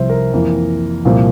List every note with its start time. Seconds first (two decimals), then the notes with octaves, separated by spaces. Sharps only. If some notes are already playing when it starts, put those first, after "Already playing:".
Already playing: C2 C3 F3 C5 E5
0.09 A#4
0.33 F2 E3 A#3
1.05 C2 A#2 F3 A#3